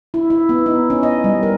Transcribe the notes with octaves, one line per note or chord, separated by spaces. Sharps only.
E4
E4
B3
D#4
C#4
D#5
G3
A#4